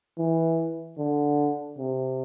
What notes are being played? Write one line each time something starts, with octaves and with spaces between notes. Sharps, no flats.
E3
D3
C3